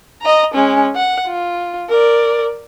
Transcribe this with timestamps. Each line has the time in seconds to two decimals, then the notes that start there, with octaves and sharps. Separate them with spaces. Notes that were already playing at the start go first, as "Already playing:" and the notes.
0.22 D#5 A#5
0.54 G#3 C#4
0.95 F#5
1.27 F4
1.89 A#4 D5